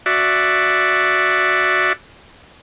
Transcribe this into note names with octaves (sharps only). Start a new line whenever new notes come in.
F#4 D5 E5